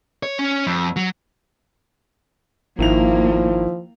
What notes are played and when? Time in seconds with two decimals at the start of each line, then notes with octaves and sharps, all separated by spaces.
0.23 C#5
0.39 C#4
0.67 F2
0.96 F#3
2.79 G#1 D#3 F3 A#3 E4 F7